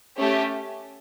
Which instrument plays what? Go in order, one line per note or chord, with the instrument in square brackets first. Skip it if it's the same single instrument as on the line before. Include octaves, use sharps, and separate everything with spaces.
[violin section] A3 C#4 G4